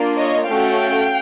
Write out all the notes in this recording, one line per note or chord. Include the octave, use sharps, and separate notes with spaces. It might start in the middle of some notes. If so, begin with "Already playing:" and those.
Already playing: A#3 D4 F4
C#5 D#5
A3 C#4 F#4 A4 F5 G5